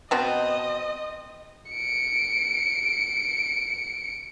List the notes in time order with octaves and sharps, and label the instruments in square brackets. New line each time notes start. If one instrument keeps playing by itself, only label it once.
[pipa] B2 C4 [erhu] D#5
[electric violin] C#7 D7